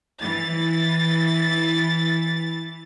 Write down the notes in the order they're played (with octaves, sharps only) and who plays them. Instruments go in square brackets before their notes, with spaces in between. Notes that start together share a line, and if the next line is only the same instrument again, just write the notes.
[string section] E3 A6